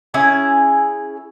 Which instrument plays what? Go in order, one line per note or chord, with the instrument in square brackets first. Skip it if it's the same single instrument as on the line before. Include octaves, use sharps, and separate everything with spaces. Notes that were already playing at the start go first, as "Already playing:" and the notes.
[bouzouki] C#4 E4 G#4 G#5